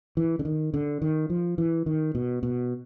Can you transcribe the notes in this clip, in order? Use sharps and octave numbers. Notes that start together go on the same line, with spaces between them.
E3
D3
D#3
D3
D#3
F3
E3
D#3
B2
B2